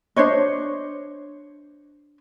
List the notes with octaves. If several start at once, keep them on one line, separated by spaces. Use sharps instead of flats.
D4 C5 C#5 D#5